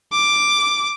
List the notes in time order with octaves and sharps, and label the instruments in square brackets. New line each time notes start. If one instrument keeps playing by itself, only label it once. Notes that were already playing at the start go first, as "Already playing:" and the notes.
[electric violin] D6